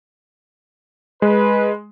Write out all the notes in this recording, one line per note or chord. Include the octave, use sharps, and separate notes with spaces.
G#3 B4